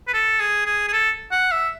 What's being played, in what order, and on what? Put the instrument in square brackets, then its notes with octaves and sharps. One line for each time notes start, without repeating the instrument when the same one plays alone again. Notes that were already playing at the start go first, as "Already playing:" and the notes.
[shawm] B4
A4
G#4
G#4
G#4
A4
F#5
E5